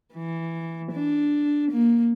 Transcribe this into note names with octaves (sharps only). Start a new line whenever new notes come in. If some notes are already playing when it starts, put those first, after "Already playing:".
E3
D4
A#3